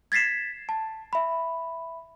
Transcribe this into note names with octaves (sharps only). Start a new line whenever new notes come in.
G#6 A6 B6 C7 E7
A5
E5 B5